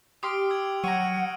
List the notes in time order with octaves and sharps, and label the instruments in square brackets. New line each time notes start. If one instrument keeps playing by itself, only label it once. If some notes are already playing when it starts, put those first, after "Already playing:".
[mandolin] G4 C6 [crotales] D#6 F6 D7
[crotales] E6 G#6
[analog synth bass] F#3 [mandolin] C#5 A#5 [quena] F#5 [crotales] E6 C#7 D#7